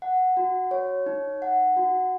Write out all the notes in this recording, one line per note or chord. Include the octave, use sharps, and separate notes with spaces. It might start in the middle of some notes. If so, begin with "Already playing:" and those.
F#5
F#4
C#5
D#4
F#5
F#4